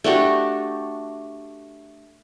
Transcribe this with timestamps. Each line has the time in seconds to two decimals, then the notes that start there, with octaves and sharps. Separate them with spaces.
0.04 A3 D4 F#4 G4